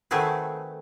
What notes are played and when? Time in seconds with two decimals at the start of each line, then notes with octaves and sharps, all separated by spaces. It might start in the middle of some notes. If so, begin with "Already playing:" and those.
0.11 D#3 A3 C4 F#4 G#4 B4